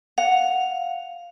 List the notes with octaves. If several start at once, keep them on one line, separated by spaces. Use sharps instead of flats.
F5 F#5